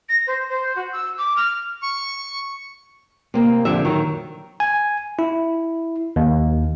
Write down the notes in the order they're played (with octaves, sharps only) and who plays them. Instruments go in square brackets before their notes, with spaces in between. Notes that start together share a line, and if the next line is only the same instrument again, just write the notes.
[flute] A#6
C5
C5
F#4
E6
D6
F6
[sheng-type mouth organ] C#6
[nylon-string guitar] C3 A#3 C4
F2 D3 F3 G4 E5
D#3 F#3
[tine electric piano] G#5
E4
D#2